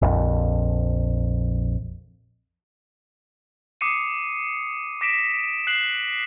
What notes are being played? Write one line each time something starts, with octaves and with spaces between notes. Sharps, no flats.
A#1 F2
D6 D#6 C7 C#7 D#7
D6 A#6 B6 D7 E7
F#6 C7 F#7